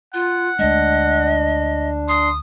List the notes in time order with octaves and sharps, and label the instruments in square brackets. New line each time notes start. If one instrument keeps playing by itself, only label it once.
[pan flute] F4 [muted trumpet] F#5
[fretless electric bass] D2 G#3 A3 [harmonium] D4 [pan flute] D#5
[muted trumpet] C6 [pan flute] D#6